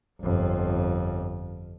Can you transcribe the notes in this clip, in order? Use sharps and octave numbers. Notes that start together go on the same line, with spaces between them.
G1 F2